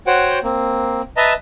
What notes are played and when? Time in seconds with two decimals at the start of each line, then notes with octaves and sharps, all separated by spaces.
0.07 F#4 C5 C#5 F#5 G5
0.44 A#3 C4
1.17 B4 D#5 E5 A5 A#5